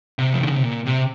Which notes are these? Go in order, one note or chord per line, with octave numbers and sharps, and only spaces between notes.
C3
F3
D#3
C#3
C3
A#2
C3